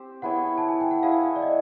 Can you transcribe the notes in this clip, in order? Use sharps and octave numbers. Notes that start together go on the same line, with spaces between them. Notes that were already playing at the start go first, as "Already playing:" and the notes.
Already playing: C4 G4 C5
B3 E4 G#4 C#5 F#5
A5
G#5
G5
F#5
B3 E4 G#4 C#5 F5
D5
D#5